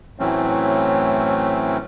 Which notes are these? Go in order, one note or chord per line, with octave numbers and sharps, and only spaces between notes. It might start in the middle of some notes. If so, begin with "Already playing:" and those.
A2 E3 F#3 A3 C4 C#4